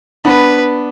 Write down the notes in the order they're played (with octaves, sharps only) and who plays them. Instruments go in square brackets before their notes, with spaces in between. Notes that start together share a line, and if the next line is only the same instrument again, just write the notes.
[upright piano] B3 D4 [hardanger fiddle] B4